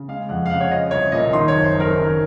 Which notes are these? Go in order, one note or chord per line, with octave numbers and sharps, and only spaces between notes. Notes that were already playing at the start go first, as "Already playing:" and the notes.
Already playing: C#3
G#3 F5
F2 F#5
F5
C#3 F#5
C#5
F3 D#5
C2 C#5
A#2 D#5
D#3 C6
C#5
F#1
C5
F#2
A#4
D#3